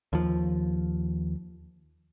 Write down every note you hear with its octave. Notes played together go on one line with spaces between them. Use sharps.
D#2 F3